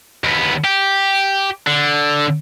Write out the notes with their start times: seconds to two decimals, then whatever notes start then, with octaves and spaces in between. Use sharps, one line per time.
0.24 D#2 B3
0.64 G4
1.67 D3